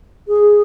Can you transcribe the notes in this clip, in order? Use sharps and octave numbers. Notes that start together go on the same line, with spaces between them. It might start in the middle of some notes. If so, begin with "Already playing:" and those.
G#4